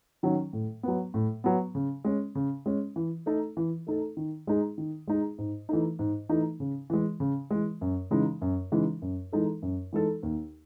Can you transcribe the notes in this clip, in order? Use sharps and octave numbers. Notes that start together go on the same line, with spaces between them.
D#3 F#3 C#4
A2
F#3 B3
A2
F#3 B3
C#3
G#3 C#4
C#3
G#3 C#4
E3
A3 D#4 A4
E3
A3 D#4 A4
D#3
G#3 D#4 G#4
D#3
G#3 D#4 G#4
G#2
E3 A3 D#4
G#2
E3 A3 D#4
C#3
E3 G#3
C#3
E3 G#3
F#2
C#3 E3 G#3 D#4
F#2
C#3 E3 G#3 D#4
F#2
E3 G#3 D#4 A4
F#2
E3 G#3 D#4 A4
D#2